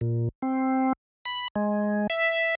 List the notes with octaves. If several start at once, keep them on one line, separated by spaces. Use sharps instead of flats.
A#2
C4
B5
G#3
E5